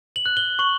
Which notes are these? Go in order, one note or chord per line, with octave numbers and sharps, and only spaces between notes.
F#7
F#6
G7
C#6 F#7